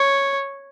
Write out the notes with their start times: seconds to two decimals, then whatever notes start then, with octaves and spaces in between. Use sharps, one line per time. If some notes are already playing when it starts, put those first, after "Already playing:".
Already playing: C#5